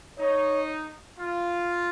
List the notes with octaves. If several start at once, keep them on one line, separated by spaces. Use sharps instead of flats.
D#4 C#5
F4